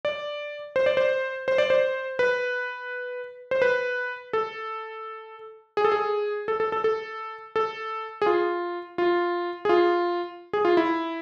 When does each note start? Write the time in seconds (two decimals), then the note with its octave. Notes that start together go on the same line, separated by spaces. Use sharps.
0.05 D5
0.76 C5
0.86 D5
0.97 C5
1.48 C5
1.58 D5
1.70 C5
2.19 B4
3.51 C5
3.62 B4
4.33 A4
5.77 G#4
5.85 A4
5.92 G#4
6.48 A4
6.60 A4
6.72 A4
6.84 A4
7.56 A4
8.22 G#4
8.26 F4
8.98 F4
9.65 G#4
9.69 F4
10.53 G#4
10.65 F4
10.77 E4